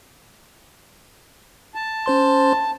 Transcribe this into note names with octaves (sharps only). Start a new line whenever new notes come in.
A5
C#4 C5 C6